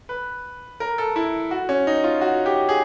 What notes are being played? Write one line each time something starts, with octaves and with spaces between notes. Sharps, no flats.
B4
A#4
A4
E4
F#4
C#4
D#4
F4
F#4
G4
G#4